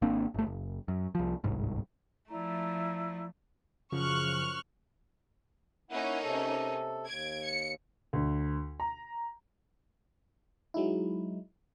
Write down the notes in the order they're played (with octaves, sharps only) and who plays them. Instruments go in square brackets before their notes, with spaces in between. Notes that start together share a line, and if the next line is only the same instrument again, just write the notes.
[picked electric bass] G#1 A#3 C4 D4
G1 A3
F#1
F#2
C2 F3
D1 G1 C2 G#2
[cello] F3 A3 [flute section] E4 D5 A#5
[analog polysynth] F#2 C#3 F3 [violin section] C#6 F6 F#6
[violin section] A#3 C#4 D#4 [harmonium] E4 F#5
[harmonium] C3 A4
[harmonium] D#2 [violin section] G#6 D7
[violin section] C#7
[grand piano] D2
A#5
[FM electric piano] F#3 G#3 D#4 E4